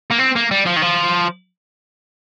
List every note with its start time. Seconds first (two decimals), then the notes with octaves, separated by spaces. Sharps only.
0.11 A#3
0.19 C4
0.36 A#3
0.51 G3
0.66 F3
0.76 D#3
0.82 F3